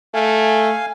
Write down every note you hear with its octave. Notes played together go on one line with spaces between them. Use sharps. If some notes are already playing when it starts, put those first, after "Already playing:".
A3 F5 G#5